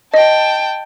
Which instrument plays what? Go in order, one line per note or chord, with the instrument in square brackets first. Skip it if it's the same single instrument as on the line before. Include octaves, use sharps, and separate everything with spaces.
[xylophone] D#5 [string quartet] G5 A5